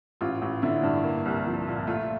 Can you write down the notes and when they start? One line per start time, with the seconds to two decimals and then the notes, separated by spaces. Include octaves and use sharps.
0.21 A1 F4
0.42 A1
0.62 D3 E4
0.83 G2
1.04 A#3
1.25 C2
1.46 F3
1.67 A#2
1.87 A3 F4